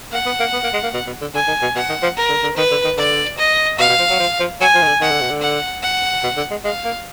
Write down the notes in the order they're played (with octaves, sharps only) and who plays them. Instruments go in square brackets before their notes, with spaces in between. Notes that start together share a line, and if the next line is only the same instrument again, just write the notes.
[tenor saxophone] A#3 [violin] F#5
[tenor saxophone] B3
A#3
B3
A#3
G#3
A#3
B2
B2
D3
[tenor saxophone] D3 [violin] G#5
[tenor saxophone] D#3
B2
[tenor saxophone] B2 [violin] F#5
[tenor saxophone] D#3
F3
[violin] A#4
[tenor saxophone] D3
D3
[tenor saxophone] D#3 [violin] B4
[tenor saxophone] D3
D#3
[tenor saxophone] D3 [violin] D5
[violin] D#5
[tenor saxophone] B2 [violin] F5
[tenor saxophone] B2
F3
F#3
F3
F3
[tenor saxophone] F#3 [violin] G#5
[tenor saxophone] F3
D#3
D3
[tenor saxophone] D#3 [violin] F#5
[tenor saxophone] D3
B2
D3
[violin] F#5
F#5
[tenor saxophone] B2
D3
G#3
[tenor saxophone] G#3 [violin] F5
[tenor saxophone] A#3